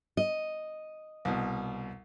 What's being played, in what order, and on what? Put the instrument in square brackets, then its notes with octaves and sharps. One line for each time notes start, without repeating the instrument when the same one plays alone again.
[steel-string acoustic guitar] D#5
[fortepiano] C2 B2